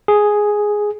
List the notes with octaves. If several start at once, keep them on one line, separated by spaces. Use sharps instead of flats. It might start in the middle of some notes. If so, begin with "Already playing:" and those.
G#4